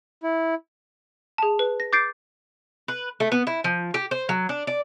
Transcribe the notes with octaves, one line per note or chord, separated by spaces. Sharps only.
E4
G#4 A5
B4
A#6
D6 G6 A6 C7 D7
B4
A3
B3
E4
F3
G4
C5
F#3
D4
D5